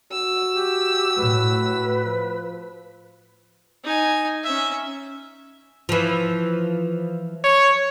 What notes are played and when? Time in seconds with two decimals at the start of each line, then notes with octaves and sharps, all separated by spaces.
0.12 F#4 E6
0.54 G4
1.17 A2 B4
2.05 F3
3.84 D#4 G#5
4.43 C#4 E5
5.89 E3 F3
7.44 C#5